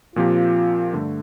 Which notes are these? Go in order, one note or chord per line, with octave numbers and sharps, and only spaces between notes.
A#2 F3 C4 F4 G4 A#4
G2 D3 A3